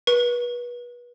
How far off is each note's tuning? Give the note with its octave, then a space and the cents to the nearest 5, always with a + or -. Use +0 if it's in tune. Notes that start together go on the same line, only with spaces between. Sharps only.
B4 -30